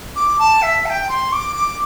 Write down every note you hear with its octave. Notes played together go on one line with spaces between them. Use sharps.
D6
A5
E5
A5
G5
C6
D6
D6